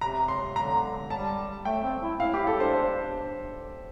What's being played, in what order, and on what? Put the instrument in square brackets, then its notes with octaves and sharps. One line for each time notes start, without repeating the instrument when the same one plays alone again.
[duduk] C3 [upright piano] A#5
[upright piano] C6
[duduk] D3 [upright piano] A#5
[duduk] G3 [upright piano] A5
[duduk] A3 [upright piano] G5
[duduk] C4
E4
[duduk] E4 [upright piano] F5
[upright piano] G4
[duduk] E4
[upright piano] A4
[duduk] D4 [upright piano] C5
[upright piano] C5